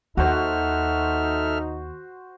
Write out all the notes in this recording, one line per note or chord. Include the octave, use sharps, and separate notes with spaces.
D#2 D#4 F#4 A4 C5 E5 F6